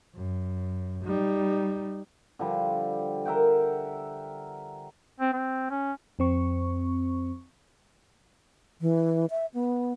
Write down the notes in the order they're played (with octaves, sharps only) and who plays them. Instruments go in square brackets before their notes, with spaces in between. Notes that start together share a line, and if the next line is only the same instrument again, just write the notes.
[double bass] F#2
G3 D#4
[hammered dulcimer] D3 F3 G3
A#4 E5 F#5 G5
[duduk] C4
C4
C#4
[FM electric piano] F2 C4 C#6
[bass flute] E3
E5
B3